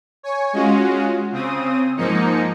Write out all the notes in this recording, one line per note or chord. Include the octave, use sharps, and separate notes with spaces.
C#5 G#5
G#3 C#4 F4 F#4
C#3 C4 D#6
G#2 F3 A#3 D#4 C#7